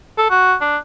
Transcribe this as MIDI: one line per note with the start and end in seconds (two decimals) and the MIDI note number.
0.18 0.26 69
0.30 0.55 66
0.61 0.77 62